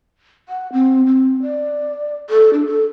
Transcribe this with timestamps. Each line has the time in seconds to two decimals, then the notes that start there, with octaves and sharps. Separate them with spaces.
0.49 F#5
0.73 C4
1.06 C4
1.42 D5
2.30 A4
2.53 D4
2.66 A4